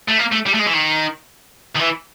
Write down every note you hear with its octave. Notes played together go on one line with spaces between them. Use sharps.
A3
A#3
A3
G3
A3
G#3
E3
D#3
D#3
E3